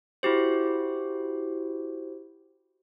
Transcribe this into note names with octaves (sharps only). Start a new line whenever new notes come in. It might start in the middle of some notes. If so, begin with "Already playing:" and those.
E4 F#4 G4 C5